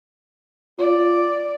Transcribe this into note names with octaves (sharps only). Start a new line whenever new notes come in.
F4 D5